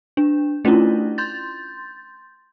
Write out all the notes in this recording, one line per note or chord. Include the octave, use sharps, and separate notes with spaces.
D4
A3 C#4 D4 E4 F4
C6 G6 A6